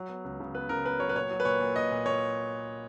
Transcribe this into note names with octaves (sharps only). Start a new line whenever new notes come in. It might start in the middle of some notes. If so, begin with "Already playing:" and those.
Already playing: F#3
B3
C#2
C#3
B3 B4
C#3 A#4
B3 B4
F#3 C#5
B4
A#2 C#5
F#3
B4
A#2 C#5
A#2
A#2 D#5
A#2
A#2 C#5